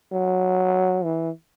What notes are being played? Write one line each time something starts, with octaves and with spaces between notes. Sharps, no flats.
F#3
E3